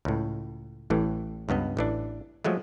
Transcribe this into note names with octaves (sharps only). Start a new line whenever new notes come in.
C#2 A2
A1 A2 E3
C#2 G2 B3 D#5
A1 E3 D4
F3 F#3 G#3 A3